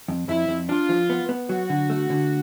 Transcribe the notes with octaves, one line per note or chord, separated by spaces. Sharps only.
F2
F2 E4
F2
D4 F4
F3
B3
B3
F#3 F#4
D3
A3
D3